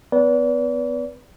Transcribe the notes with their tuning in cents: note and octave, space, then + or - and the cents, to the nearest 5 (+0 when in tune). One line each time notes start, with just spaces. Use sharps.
B3 +30 B4 -20 D5 -40